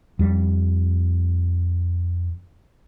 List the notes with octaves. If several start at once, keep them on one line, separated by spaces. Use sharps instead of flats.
F2 G3